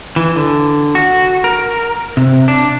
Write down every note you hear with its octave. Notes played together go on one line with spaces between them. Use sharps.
E3
D3
F#4
A#4
C3
D4